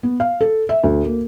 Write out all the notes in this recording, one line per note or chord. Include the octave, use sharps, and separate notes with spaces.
B3
F5
A4
E5
D2
A#3